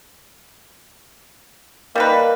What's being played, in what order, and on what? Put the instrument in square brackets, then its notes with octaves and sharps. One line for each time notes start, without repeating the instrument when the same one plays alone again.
[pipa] G3 D#4 B4 [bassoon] A#3